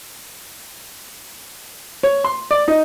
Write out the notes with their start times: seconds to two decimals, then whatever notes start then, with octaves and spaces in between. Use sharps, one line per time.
2.03 C#5
2.24 C6
2.51 D5
2.68 D#4